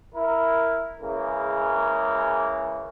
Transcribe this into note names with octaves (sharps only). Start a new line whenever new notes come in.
E4 A#4
C#3 E3 G#3 A#3